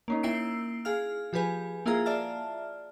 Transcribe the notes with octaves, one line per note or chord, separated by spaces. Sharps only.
A#3 C#4 D#4
A#3 E4 G5 E6 C7 D7
G#4 F5 F6
F3 G4 G#4 B4 G#5
A#3 E4 F4 G#4 F5 A#5
D5 E5 A5 F6